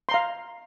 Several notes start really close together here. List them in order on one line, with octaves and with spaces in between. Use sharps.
C6 A#5 F5